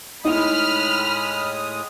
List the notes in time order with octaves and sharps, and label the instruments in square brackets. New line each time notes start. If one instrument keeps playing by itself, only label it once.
[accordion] A2 G#3 D#6 [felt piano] D#4 E4 [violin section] B5 F6